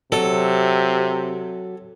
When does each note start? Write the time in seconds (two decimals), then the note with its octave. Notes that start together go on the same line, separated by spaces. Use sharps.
0.12 C3 F#3 A4